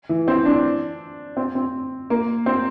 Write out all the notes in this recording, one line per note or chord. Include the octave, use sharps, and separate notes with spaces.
E3
C4
D4
C4
C4
A#3
C4